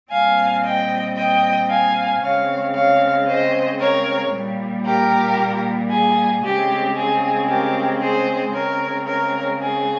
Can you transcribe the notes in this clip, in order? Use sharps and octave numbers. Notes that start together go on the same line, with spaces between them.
A#2 G3 C4 F5 G#5
D#5 G5
D#5 G5
F5 G#5
C#3 G#3 C4 C#5 F5
C#5 F5
C5 D#5
A#4 C#5
A#2 G3 A#3
G4 A#4
G#4
C#3 G#3 C4 G4
G#4
G4 A#4
G#4 C5
C#3 G#3 C4 A#4 C#5
A#4 C#5
G#4